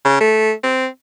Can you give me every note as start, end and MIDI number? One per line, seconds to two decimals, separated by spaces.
0.05 0.17 49
0.20 0.52 57
0.64 0.87 60